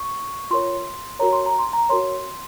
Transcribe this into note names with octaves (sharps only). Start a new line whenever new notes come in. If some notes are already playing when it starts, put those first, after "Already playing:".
Already playing: C#6
F4 A#4 C#5 C6
F#4 A#4 C#5 A#5
C6
A#5
C6
A#5
F#4 A#4 C#5 C6